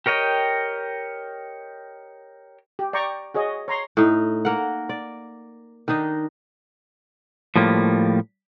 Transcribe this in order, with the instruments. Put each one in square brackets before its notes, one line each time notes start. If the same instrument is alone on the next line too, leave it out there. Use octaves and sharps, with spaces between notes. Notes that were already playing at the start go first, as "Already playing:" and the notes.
[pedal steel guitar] G4 A#4 C#5 D#5 G5
[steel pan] G4
D5 G5 A#5 C#6
F#4 G#4 C#5 D#5
C#5 A#5 C6
[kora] A2 D#4
A#3 A#4 F#5
D5
D#3 D4 D#4 D#5
[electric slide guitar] A2 F3 G3 A#3